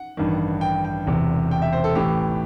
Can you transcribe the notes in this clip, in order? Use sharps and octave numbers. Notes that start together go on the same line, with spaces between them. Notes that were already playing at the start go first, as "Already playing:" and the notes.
Already playing: F#5
A1 G2 D#3
G5
G5
E1 E2 C3
G5
E5
C5
A4
A1 A2 E3 G4